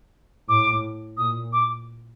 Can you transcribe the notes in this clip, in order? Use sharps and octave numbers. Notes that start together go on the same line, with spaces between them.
A2 D6
A#2 D#6
D6